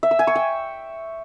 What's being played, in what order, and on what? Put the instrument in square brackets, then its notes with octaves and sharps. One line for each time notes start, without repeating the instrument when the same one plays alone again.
[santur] E5
E6
G#5
C#6
G5